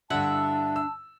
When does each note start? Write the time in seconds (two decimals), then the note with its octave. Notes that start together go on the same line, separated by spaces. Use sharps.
0.10 G2 D3 D4 E4 E5 F#5 A5
0.76 E6